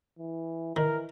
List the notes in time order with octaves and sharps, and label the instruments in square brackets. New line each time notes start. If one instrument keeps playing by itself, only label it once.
[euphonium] E3
[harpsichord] D#3 [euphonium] E3 [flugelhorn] A#4